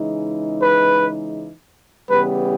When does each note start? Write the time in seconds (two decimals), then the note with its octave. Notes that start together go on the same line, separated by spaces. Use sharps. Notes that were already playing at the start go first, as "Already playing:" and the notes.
Already playing: C#3 E3 G#3 D#4
0.62 B4
2.10 C#3 E3 G3 B3 G4 B4